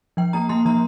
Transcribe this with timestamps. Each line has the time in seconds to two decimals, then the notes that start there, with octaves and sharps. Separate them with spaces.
0.17 F3 G5
0.33 A#3 A#5
0.49 A#3 C6
0.65 F3 A#5